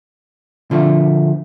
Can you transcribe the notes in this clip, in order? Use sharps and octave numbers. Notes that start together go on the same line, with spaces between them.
D3 F3 A3